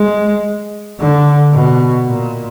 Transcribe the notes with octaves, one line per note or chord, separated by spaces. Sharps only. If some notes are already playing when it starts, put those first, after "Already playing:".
Already playing: G#3
D3
B2
A#2